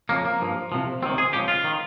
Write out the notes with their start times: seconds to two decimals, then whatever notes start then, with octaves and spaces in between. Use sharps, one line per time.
0.09 F2 C#3 F3 A#3
0.25 A#3
0.41 G2 F3
0.72 C2 C3 F3
1.02 C#2 C3 D#3 C4
1.18 G#4
1.33 C#2 C#3 F3 G4
1.48 F4
1.64 D#3